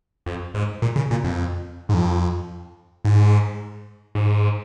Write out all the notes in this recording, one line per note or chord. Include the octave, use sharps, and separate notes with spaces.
F2
G#2
A#2
C#3
A#2
F2
G#2
F2
G#2
G#2